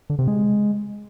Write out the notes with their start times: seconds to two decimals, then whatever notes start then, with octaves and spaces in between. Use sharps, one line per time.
0.10 D3
0.19 C3
0.28 G#3